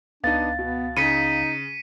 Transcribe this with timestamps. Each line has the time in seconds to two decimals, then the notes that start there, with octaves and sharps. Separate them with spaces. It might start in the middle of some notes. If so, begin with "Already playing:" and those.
0.24 C#2 B3 D4 D#4 F5 A6
0.59 B2 B3
0.97 C#3 D#4 B6 C#7 D#7